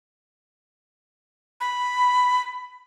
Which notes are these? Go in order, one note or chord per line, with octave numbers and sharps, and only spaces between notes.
B5